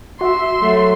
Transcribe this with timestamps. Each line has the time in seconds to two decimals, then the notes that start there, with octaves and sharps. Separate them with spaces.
0.21 F#4 E5 C6
0.61 F#3 A3